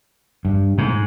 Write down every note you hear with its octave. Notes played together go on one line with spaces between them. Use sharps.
G2
G#2